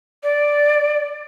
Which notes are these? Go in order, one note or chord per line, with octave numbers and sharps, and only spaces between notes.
D5